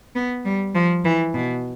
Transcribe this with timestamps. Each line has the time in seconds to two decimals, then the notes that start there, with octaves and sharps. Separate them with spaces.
0.16 B3
0.45 G3
0.75 F3
1.05 E3
1.34 B2